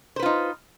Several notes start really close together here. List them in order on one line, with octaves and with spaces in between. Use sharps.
C5 B4 F4 D#4